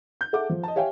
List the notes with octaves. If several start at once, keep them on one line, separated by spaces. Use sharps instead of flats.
G6
G#4 A4 E5 F#5 D6
F3
D#5 A5
G4 C#5 E5 F5 G5 G#5